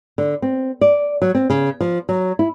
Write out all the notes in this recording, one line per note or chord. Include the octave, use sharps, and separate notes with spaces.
D3
C4
D5
F#3
C4
C#3
F3
F#3
E4